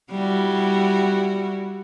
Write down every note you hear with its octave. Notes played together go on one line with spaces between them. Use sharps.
G3 E4 F#4